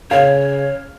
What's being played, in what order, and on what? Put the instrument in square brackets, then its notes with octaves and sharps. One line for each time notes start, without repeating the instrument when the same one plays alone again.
[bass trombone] C#3 [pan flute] C#5 [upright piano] F5